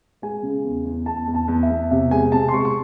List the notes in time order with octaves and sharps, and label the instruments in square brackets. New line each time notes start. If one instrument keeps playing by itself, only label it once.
[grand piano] G#3 G#5
C#3
E2
E2
E2 A5
E2
A5
E2
E5
E2
C3 E5
G#3 G#5
C3 A5
C6
G#3 C#6
C#6